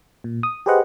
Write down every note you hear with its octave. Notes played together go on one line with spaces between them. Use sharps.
A#2
D#6
G4 G#4 B4 C5 D#5 F#5